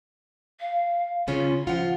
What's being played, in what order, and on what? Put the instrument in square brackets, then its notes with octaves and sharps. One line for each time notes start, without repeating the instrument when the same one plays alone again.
[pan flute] F5
[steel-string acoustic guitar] C#3 C#4 [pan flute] F4
[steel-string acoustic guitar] F3 F4 [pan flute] F#5